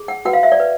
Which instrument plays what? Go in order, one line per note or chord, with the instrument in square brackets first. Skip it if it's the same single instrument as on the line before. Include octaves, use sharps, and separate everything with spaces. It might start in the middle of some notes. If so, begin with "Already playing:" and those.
Already playing: [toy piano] G#4
F#5
F#4 B4 F#5
F5
E5
D5
B4